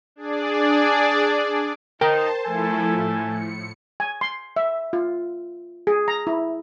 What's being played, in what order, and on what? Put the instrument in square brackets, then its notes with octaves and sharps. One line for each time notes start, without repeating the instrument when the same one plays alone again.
[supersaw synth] D4 G#4 D5
[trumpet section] D#4 [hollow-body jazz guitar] A#4 G5 [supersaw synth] C5 A5
[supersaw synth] F3 A3 E4 [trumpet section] A4 G#5
[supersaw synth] A2
C#7
[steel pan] G#5
C6
E5
F4
G#4
A#5
E4